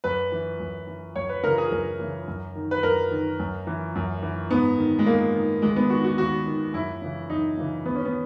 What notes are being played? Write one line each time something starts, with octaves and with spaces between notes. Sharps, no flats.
F#2 B4
E3
F#2
E3
F#2 C#5
B4
C#3 E3 A#4
G#4
F#2 A#4
C#3 E3
F#2
D#3
B4
F#2 A#4
D#3
F#2
E3
F#2
E3
G#2 B3
D#3
G#3
G#2 A#3
D#3
D#2 G#3
B3
D#3 F#4
F#4
D#2 F#4
D#3
F#2 E4
C#3 E3
F#2 D#4
C#3 E3
D#2 B3
C#4
B3